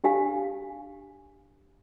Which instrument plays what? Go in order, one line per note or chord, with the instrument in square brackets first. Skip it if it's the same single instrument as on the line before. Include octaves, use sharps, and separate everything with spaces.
[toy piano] D4 G4 F5 G#5